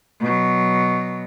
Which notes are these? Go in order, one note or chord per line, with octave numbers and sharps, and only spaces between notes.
B2 F#3